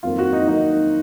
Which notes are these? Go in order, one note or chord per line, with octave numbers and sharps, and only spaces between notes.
F2 D#3 F#3 A#3 F4
F#4
D#4
F2 D#3 F#3 A#3 D#4